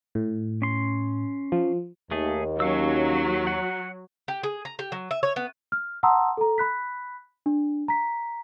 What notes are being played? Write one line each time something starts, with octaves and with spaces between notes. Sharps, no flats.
A2
C#4 C6
F3
D#2 A3 G#4
F#3 C#4 F5 E6
F#5
G4
G#4
A#5
G4
F#3
E5
C#5
B3
F6
F#5 A5 A#5 C6 D#6 E6
A4 A#5
B5 F#6 B6
D4
A#5 B6